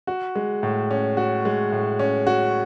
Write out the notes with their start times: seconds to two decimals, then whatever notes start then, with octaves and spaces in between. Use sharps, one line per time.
0.07 F#4
0.35 G#3
0.63 A2
0.91 C#4
1.17 F#4
1.45 G#3
1.72 A2
1.99 C#4
2.27 F#4